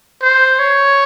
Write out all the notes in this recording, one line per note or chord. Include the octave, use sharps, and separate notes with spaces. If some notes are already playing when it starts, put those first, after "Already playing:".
C5
C#5